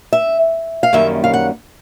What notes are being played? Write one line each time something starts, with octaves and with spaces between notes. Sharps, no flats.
E5
F5
F#2 D#3 G3 A#3 C#4 E5
F5
F#5